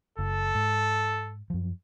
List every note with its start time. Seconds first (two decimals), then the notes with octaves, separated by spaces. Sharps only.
0.19 F#1 A4
0.55 G#2
1.50 F#2 F3